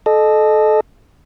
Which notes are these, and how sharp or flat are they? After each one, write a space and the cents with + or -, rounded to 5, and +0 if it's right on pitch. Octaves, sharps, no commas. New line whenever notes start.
A4 -25 D#5 -25